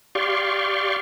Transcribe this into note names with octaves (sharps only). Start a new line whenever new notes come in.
G4 D5 F5 C6 C#6